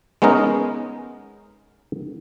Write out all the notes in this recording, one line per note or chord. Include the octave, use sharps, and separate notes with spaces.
G#3 B3 C#4 D#4 A#4